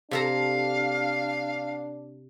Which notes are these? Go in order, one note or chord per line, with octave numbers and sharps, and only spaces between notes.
C3 D4 A4 F5 A#5